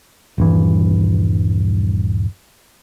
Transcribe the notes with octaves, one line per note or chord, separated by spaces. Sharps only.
D#1 G2 E3